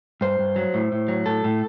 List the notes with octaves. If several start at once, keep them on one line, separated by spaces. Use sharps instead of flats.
G2 C5
G2
F#3
A2
A2
F#3
A2 A4
A2